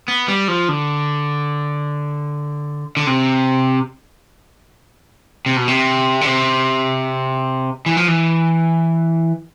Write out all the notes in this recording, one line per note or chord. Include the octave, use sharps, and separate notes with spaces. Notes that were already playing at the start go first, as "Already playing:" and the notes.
B3
G3
F3
D3
D3
C3
C3
B2
C3
D3
C3
E3
F3
E3